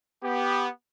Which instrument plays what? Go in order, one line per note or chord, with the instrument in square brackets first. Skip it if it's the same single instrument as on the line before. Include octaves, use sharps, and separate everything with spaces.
[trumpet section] B3 G4